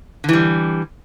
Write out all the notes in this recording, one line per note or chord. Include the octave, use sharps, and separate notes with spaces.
D3 E3 G3